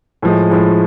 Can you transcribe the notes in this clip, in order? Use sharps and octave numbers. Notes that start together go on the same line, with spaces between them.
A2 F3 G#3
A2 F3 G#3